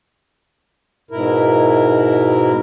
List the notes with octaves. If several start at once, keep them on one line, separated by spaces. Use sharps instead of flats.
G#2 B2 E4 A#4